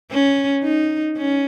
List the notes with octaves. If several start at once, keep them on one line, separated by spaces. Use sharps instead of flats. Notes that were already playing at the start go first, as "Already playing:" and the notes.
C#4
D#4
C#4